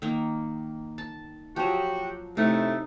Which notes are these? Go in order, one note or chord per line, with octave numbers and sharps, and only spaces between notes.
D#3 A#3
A5
F3 F#3 F#4 G4
A2 C3 A3 D#4